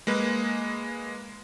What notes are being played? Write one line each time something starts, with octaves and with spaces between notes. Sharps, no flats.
G#3 A#3 B4